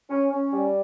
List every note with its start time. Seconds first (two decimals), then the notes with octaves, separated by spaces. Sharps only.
0.10 C#4
0.32 C#4
0.53 G3